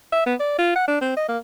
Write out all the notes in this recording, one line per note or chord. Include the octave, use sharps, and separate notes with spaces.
E5
B3
D5
F4
F#5
D4
C4
D#5
A#3